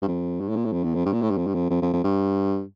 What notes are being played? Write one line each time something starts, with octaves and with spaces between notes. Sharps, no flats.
G2
F2
G2
A2
A#2
A2
F2
E2
F2
G2
A#2
A2
G2
F2
G2
F2
F2
F2
F2
G2